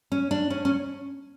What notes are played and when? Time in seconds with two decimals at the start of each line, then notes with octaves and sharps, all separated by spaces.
0.12 C#4
0.31 D4
0.50 C#4
0.65 C#4